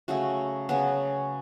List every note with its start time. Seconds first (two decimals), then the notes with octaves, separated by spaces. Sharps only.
0.08 C#3 F#3 A3 F#4
0.69 C#3 F#3 B3 F#4